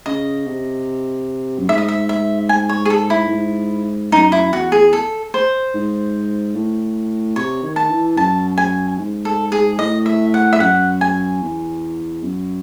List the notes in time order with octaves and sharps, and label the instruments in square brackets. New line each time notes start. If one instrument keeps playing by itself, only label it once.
[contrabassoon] C#3 [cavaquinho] D#5
[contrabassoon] C3
F#2
[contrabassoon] G#2 [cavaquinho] E5
[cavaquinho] D#5
E5
E5
G#5
C#5
G#4
A4
E4
[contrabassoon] A2
G#2
[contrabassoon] F#2 [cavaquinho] D#4
[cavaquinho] E4
[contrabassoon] E2 [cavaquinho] F#4
[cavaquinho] G#4
A4
C5
[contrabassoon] G#2
A2
[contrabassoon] C3 [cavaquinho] C#5
[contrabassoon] D#3
[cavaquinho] A5
[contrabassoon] E3
[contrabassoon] F#2 [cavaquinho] A5
[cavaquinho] G#5
[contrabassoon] G#2
[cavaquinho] A4
G#4
[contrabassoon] A2 [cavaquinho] D#5
[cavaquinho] E5
F#5
E5
[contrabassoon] F#2 [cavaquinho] F#5
[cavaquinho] G#5
[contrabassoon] E2
F#2